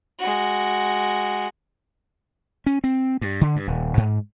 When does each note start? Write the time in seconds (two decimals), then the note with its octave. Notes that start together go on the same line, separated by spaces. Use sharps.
0.20 G#3 F#4
2.66 C#4
2.84 C4
3.21 G2
3.41 D3
3.56 G2
3.67 D#1
3.97 G#2